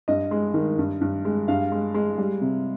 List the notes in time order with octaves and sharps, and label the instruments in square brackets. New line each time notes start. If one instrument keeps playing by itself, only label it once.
[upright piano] G2 D#5
G#3
D#3
G2
G2
G#3
G2 F5
G#3
G#3
G3
C3